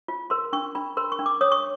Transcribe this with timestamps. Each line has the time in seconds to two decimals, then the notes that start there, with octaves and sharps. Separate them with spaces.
0.08 F4
0.30 A#4 C6
0.53 D4 C#6
0.75 D4 B5
0.97 A#4 C6
1.12 C#6
1.19 D4
1.26 D6
1.41 C#5 D#6
1.52 C#6